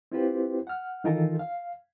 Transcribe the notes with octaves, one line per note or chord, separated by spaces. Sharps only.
C4 E4 F4 G4 B4 C5
F#5 F6
D#3 E3 D#4 F4 A4 A#4
F5